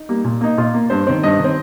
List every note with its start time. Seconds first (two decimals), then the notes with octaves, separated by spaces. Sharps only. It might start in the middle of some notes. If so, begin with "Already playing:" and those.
Already playing: D#4
0.09 G3 A#3
0.24 A#2
0.41 A#3 D#4
0.57 A#2 F4
0.74 A#3
0.90 G2 C5
1.07 D#3 C4
1.23 G2 D#5
1.39 D#3
1.44 C4